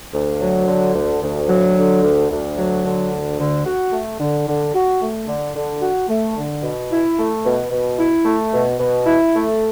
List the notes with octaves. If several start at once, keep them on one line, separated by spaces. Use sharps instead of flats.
D2
F#3
D3
D2
D2
F#3
D3
D2
D2
F#3
D3
D2
D3
F#4
A3
D3
D3
F#4
A3
D3
D3
F#4
A3
D3
B2
E4
A3
B2
B2
E4
A3
B2
B2
E4
A3